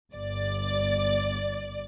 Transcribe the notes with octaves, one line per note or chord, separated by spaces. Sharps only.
G1 D5